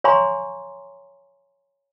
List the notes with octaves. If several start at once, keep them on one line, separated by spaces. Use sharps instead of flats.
C#5 F5 G#5 A#5 C6 C#6